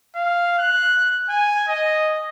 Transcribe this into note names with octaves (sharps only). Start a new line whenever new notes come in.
F5
F#6
G#5
D#5